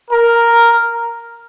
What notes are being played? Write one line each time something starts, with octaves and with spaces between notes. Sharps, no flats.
A#4